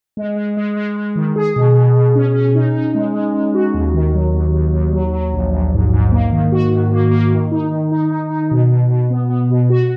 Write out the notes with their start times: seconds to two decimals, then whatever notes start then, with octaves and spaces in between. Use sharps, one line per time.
0.17 G#3
0.36 G#3
0.57 G#3
0.77 G#3
0.96 G#3
1.16 D#3
1.36 G#4
1.56 B2
1.75 B2
1.96 B2
2.15 C#4
2.35 C#4
2.55 D#4
2.75 D#4
2.95 G#3
3.14 G#3
3.34 G#3
3.54 F#4
3.74 D#2
3.94 D#3
4.14 F#3
4.34 D#2
4.54 D#2
4.74 D#2
4.93 F#3
5.13 F#3
5.33 A#1
5.53 A#1
5.73 G#2
5.93 G#2
6.12 A#3
6.32 D#3
6.52 F#4
6.72 D#3
6.92 A#3
7.11 A#3
7.32 D#3
7.52 D#4
7.72 D#3
7.92 D#4
8.11 D#4
8.30 D#4
8.51 B2
8.70 B2
8.91 B2
9.11 B3
9.30 B3
9.50 B2
9.70 F#4